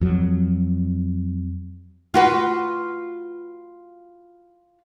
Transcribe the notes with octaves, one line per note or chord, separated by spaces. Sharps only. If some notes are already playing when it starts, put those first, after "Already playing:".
F2 F#3
F4 F#4 B4